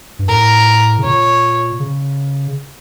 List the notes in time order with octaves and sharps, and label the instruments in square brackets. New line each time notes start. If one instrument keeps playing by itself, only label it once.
[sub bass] G2
[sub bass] A2 [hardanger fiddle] A#4
[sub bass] C#3
[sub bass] A#2 [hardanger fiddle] C#5
[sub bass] C#3